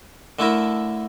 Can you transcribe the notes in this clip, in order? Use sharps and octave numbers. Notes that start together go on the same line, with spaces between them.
D3 A3 E4 A#4